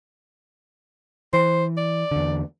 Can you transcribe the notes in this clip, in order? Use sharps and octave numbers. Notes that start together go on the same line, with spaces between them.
E3 C5
D5
E2 D3